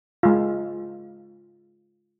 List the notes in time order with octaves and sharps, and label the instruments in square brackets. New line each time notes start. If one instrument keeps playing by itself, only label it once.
[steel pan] G#3 F4